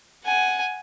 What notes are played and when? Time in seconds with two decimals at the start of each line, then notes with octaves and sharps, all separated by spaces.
0.25 F#5 G#5